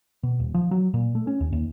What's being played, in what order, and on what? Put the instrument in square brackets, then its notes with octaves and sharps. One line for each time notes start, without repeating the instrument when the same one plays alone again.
[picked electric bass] B2
D#1
F3
F#3
A#2
A3
C#4
D#2
D#2